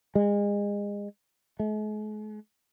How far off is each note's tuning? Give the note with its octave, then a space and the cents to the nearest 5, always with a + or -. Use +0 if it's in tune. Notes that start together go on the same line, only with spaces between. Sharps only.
G#3 -30
G#3 +45